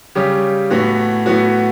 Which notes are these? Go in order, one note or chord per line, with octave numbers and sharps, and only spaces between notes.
C#3 G3 C#4 G4
A2 E3 B3 F#4
A2 E3 B3 F#4